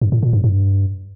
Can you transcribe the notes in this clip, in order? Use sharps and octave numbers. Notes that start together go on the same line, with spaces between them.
G2
A2
A#2
G2
G2